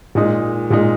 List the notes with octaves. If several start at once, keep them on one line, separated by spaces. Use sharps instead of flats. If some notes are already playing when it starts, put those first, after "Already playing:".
A#2 G#3 D#4
A#2 G#3 D#4